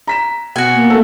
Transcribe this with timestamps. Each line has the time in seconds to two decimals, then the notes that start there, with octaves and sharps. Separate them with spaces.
0.07 A#5 B6 E7
0.56 B2 F#4 G#5
0.74 A#3
0.90 A3 A4